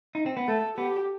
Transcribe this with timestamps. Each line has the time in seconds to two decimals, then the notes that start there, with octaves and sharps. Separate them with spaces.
0.15 D#4
0.26 C4
0.37 B3
0.48 A3 A4
0.78 B3 G4